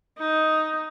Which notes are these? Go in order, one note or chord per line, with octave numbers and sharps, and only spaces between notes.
D#4